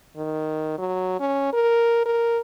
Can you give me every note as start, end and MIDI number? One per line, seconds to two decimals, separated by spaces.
0.16 0.73 51
0.78 1.17 54
1.20 1.52 61
1.53 2.06 70
2.06 2.40 70